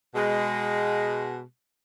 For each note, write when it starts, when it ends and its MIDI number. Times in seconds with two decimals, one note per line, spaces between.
0.14 1.42 47
0.14 1.42 56